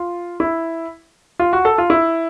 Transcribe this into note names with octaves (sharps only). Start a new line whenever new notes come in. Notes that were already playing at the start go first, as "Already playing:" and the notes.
Already playing: F4
E4
F4
F#4
A4
F4
E4